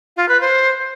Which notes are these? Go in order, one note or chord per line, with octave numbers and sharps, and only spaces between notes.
F4
B4
C5